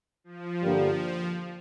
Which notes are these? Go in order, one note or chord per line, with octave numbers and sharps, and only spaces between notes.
F3
G2 D3 G3 A#3